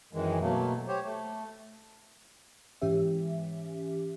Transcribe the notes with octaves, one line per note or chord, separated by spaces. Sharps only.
F#2 D#3 E3 G#3
B2 F#3 A3 A#3
G4 C5 C#5
A3
G#2 E3 C#4 G4 E5